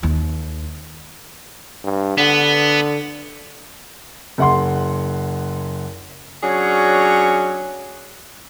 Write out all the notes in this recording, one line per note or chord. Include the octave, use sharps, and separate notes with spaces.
D#2
G2
D3 B3
F#1 F#5 C6
F#3 C#4 D4 G#4 C#5